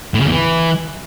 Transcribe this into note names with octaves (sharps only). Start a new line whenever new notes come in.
A2
C#3
E2
E3